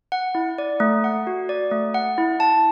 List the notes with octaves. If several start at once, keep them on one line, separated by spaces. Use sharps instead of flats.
F#5
E4
D5
A3
F#5
F#4
D5
A3
F#5
E4
A5